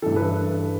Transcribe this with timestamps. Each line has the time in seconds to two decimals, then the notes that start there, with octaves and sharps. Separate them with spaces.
0.02 G2 E3 A4
0.16 B4